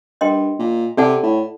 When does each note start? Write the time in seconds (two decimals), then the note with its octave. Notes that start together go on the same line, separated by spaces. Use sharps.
0.21 G2 A#4 D#5 G5 C6
0.59 A#2
0.97 C3 A4 D5 F#5 A5
1.23 A2